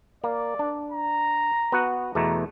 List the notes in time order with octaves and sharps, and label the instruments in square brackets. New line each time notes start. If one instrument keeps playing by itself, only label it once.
[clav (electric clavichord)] A#3 [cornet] D5
[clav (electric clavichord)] D4
[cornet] A#5
[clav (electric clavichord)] B3 F#4 F#5
[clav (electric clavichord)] E2 B2 A3 [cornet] A#5